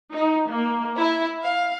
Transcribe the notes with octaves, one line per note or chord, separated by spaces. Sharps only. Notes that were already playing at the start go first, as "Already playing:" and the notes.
D#4
A#3
E4
F5